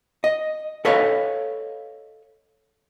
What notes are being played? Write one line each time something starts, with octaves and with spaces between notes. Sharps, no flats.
D#5
A4 B4 C#5 D#5 F5